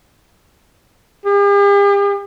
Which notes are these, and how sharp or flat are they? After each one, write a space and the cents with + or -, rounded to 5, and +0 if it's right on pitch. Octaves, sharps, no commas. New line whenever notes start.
G4 +45